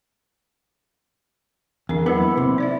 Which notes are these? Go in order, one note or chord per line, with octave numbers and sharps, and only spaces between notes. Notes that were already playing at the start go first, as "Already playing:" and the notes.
E2 D4 A#4
E3 F#3 A#3 B3 E4
C3
D#4 C5 D5 E5